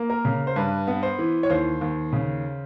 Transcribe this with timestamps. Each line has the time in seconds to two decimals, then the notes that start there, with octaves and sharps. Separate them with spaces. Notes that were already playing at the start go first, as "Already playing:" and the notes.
Already playing: A#3
0.10 A#4
0.25 C#3
0.47 C5
0.56 G2 B4
0.87 B3
1.03 C5
1.19 E3
1.43 C#5
1.50 D#2 C5
1.81 D#2
2.13 C#3